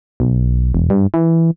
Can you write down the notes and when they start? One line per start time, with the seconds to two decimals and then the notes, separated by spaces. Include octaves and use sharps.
0.20 B1
0.74 E1
0.90 G2
1.14 E3